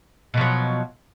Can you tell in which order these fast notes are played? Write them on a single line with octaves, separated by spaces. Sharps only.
B2 F3 F#3